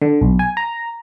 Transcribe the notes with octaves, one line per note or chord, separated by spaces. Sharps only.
D3
B1
G#5
A#5